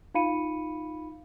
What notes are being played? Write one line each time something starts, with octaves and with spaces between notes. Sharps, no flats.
D#4 F4 F5 B5 C#7 D#7